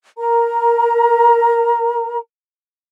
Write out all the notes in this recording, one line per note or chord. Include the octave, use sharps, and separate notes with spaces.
A#4 A#5